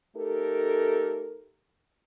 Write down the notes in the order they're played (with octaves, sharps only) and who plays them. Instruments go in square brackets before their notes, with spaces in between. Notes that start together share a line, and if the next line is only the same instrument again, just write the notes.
[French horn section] A3 D#4 G4 A4 A#4